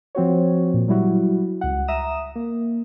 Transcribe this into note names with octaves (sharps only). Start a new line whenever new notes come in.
F3 C4 F#4 C#5
A#2
F#3 G3 E4 F#4
C#2 F#5
E5 A#5 D#6 E7
A#3